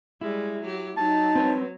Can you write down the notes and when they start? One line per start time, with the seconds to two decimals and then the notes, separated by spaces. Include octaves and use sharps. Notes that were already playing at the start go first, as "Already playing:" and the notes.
0.21 G3 G#3 E4
0.62 F#3 G4
0.97 F#3 D#4 A5
1.35 C4 B4 C#5